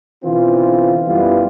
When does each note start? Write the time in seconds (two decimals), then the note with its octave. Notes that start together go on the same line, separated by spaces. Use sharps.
0.23 B2 D3 E3 C4 F4
1.07 F#2 E3 G3 B3 E4 F4